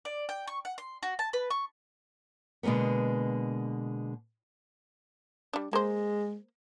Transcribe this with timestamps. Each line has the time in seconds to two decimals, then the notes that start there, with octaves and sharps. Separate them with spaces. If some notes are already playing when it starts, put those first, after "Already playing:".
0.05 D5
0.29 G5
0.47 C#6
0.65 F#5
0.78 C6
1.03 F#4
1.19 A5
1.33 B4
1.50 C#6
2.63 B2 D3 G#3 A#3 B3
5.53 G3 D4
5.73 G#3 A#3 C5